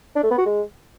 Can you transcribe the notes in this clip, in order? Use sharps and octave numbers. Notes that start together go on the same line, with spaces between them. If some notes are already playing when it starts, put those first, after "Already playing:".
D4
A3
B3
F#4
G#3